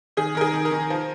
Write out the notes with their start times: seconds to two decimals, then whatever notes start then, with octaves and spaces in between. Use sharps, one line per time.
0.17 D#3 G#4
0.35 D#3 A#4
0.41 G#4
0.54 D#3
0.65 A#4
0.71 D#3
0.90 F3